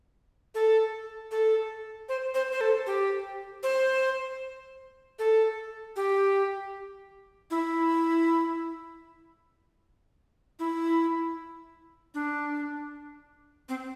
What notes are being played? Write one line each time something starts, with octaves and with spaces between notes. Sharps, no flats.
A4
A4
C5
C5
C5
A4
G4
C5
A4
G4
E4
E4
D4
C4